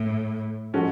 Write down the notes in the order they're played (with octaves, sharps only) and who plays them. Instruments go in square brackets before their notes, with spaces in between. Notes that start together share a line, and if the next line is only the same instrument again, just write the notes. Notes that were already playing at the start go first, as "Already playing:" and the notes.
Already playing: [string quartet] A2
[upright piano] F3 G#3 C#4 F#4 A4